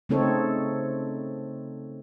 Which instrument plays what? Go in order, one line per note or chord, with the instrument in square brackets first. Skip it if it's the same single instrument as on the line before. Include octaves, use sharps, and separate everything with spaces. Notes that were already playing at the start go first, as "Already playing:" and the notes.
[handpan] C#3 A3 C4 D#4 A4 C#5